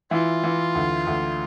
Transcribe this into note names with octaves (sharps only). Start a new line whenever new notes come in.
E3 F4
E3
D2
D2